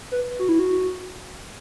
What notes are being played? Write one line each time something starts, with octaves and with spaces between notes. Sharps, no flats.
B4
F#4
E4
F#4